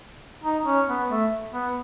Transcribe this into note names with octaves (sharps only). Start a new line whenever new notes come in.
D#4
C#4
B3
A3
B3